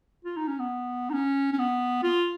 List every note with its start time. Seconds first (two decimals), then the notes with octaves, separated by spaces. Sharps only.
0.25 F4
0.37 D#4
0.48 C#4
0.59 B3
1.10 D#4
1.14 C#4
1.53 C#4
1.59 B3
2.03 F4